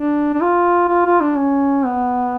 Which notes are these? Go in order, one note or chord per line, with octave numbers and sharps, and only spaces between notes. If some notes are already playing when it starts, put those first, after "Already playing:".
Already playing: D4
D4
F4
F4
F4
D4
C#4
B3